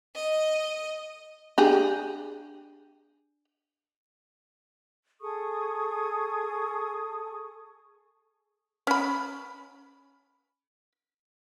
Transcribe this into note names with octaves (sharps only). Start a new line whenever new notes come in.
D#5
D4 G4 G#4
G#4 A4 C#6 D#6
C#4 B5